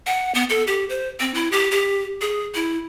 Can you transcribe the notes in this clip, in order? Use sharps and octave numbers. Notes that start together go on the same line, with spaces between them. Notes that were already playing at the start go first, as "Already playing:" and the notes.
F#5
B3
A4
G4
C5
C4
E4
G4
G4
G#4
E4